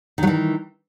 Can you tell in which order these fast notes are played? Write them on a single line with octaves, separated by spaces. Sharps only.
D#3 F#3 E3